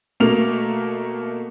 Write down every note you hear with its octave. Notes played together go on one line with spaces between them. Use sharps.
B2 A3 A#3 A#4 F7